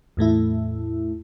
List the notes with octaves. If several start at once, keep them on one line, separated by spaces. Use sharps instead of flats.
E2 A2 A3 E4